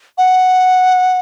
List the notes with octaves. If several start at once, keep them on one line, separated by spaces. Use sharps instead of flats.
F#5